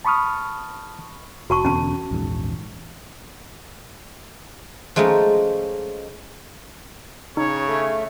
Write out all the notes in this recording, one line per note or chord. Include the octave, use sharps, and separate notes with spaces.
A5 B5 C#6 D#6 F6
F1 F#4 A5 C#6
E2 B2 D3 C#4 A5
A#1 E2 G#2
F3 G#3 A3 C#4 D#4
C#3 D#4 C#5
A3